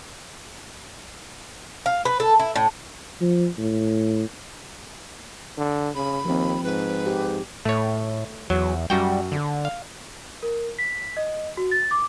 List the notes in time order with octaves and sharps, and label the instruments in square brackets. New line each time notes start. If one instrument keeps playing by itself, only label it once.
[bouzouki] F5
B4
A4
E4
A2
[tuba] F3
A2
[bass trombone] D3
[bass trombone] C#3 [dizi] B5
[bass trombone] D#2 [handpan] F3 C4
[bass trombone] G#2 [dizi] B4
[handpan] G4
[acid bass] A2 [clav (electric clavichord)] A3 C#5
[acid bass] E2 [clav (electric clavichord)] F#3
[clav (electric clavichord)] F#2 F#4 G5 [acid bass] G3
[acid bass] D3
[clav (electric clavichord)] F5
[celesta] A#4
B6
D#5
F#4
A6
D6